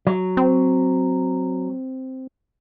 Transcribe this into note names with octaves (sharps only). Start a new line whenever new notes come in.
F#3
C4